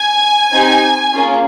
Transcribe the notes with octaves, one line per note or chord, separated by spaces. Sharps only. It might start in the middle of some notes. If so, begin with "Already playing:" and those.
Already playing: G#5
C4 D#4 G4
A#3 C#4 F4 G#4